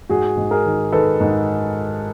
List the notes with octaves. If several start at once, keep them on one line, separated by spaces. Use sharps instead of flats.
G#2 F#4 G#4
G#2
G#4 A#4
D#3
D#3 A4 B4
G#2